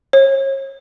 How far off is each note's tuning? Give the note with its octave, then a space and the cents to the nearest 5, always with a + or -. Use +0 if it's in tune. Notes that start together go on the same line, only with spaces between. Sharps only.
C#5 -35